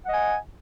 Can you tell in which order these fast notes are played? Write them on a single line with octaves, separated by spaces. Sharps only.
F#5 D#5 G#5